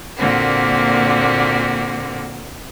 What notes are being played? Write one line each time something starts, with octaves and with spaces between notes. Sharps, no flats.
A#2 D3 A#3 C4 F#4